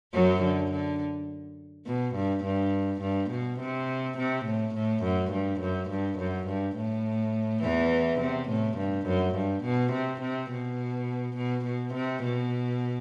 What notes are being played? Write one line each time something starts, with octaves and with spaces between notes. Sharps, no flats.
F#2 F#3
D3
D3
B2
G2
G2
G2
B2
C3
C3
A2
A2
F#2
G2
F#2
G2
F#2
G2
A2
E2 E3
C3
A2
G2
F#2
G2
B2
C3
C3
B2
B2
B2
C3
B2